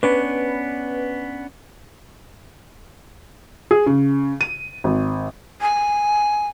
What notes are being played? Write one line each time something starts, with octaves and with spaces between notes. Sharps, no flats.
B3 C#4 D4 B4
G#4
C#3
D#7
G#1
G#5